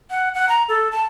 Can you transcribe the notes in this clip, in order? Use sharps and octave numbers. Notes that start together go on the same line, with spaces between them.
F#5
F#5
A#5
A4
A5